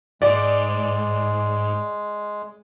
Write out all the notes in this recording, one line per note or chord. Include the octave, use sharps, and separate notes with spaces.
F2 G#2 G#3 D5